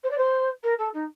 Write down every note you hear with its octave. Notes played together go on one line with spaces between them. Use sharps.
C5
D5
C5
A#4
A4
D#4